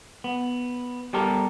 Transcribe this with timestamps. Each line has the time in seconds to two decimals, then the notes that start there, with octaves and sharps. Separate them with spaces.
0.24 B3
1.13 G3 B3 G4 A4 A#4